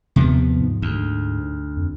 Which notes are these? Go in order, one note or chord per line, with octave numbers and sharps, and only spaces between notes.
D#2 C3 F3 B3
G#2
D2
F2